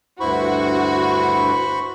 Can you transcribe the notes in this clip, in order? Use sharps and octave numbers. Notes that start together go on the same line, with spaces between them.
D2 G2 E4 F#4 C5 B5 C#6